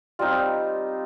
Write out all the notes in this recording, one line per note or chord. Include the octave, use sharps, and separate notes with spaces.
G3 C4 D#4 F4